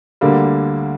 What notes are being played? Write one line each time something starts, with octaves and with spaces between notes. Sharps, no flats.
D2 D3 G3 A#3